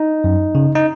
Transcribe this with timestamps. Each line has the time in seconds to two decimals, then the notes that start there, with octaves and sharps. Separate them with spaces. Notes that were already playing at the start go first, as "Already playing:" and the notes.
Already playing: D#4
0.24 F#2
0.55 C#3
0.75 D#4